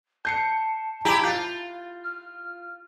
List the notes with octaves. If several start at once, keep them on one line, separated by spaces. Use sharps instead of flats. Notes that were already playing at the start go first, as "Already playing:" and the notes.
A5 G6 C7 C#7
E4 G4 G#4 A#5 D6
F4 G6 A6
F6